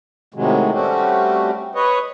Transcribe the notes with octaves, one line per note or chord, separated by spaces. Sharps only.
A2 C3 D#3 F#3 G#3
G3 A3 C4 C#4 F#4 G4
B4 C#5 D#5